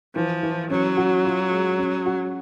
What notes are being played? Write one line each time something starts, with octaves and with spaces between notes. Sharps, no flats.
E3 F3
E3
F#3 C#4
F#4
F4
G#3
C#4
F#4